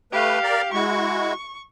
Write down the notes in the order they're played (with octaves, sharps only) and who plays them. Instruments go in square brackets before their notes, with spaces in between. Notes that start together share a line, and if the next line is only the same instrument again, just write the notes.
[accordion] A3 B4 [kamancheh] G4 F5
[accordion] A#4 D5
[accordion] G#3 E4 F#4 [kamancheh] C#6